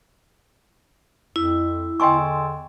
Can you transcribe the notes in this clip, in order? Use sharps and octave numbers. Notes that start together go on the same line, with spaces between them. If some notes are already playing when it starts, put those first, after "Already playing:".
F2 E4
E2 D3 D#5 G5 G#5 C6 C#6 E6